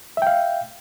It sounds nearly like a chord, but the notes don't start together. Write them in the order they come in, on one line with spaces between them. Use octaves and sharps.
E5 G5 F5